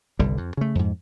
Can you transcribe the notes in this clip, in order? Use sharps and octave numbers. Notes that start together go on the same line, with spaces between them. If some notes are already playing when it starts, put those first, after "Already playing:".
G1 C2 D3 G3
F2
C#3 A3
F2 G#2